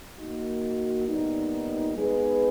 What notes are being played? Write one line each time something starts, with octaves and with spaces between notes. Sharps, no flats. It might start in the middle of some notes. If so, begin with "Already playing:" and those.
A#3 D#4 F#4
A#2 G3 B3 D#4
G#3 B3 D#4 G#4 B4